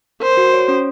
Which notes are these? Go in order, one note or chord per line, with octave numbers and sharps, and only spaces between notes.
A#4 C5
F#4
C#5
C#4